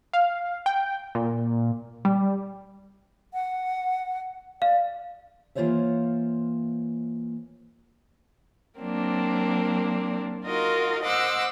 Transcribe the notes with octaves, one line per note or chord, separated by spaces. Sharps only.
F5
G5
A#2
G3
F#5
D5 F5
E3 A#3 F4 C5 C#5 E5
F#3 A#3 C4 D4
D#4 F4 F#4 A#4 D#5
C5 D#5 F#5 D6 E6 F#6